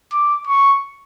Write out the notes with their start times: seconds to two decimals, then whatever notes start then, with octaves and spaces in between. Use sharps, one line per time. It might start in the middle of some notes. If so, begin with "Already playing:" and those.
0.12 D6
0.47 C#6